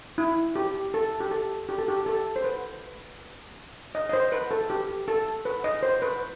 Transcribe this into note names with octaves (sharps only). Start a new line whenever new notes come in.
E4
G4
A4
G4
A4
G4
A4
G4
A4
C5
B4
D#5
D#5
C5
B4
A4
G4
A4
B4
D#5
C5
B4